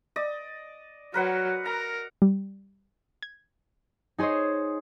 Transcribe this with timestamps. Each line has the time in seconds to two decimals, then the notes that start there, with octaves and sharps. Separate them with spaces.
0.16 D5 D#5
1.14 F#3 A#4 B4 F#5
1.66 A#4 A#5
2.22 G3
3.22 G#6
4.18 D#4 G#4 C5 C#5 D#5